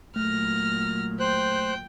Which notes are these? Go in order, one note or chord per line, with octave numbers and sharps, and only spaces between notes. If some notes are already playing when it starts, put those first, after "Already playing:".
A#2 F#3 A3 F6 A#6
C5 G5 F#6